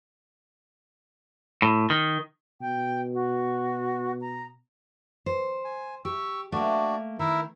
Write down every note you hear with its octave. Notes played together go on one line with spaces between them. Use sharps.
A2
D#3
B2 G5
F#4
A#5
C5
G#5
G4 C#6 E6
A3 A#3 D4 F#4 D5
D#3 E4 A#4 E5